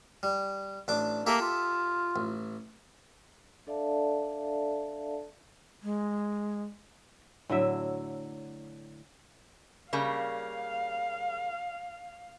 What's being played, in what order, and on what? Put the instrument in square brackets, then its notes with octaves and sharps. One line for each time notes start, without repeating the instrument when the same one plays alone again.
[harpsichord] G3
A1 D4 D6
[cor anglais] A#3 [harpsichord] G4 A4 E5
[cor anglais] F4
[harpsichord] A1
[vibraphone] D4 A4 D5 E5 F5 A5
[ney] G#3
[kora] A2 D3 F#3 E5
[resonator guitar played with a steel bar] C#3 G3 A#3 [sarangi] F5